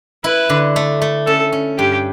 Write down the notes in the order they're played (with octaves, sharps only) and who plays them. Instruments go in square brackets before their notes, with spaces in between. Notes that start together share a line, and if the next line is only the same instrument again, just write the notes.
[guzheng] E4 [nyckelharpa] B4
[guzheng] D3
A3
A3
[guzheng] C#4 [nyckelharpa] A4
[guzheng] C#4
[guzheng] G2 [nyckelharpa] G4